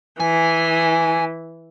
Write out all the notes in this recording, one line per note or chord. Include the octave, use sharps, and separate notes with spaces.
E3 G#5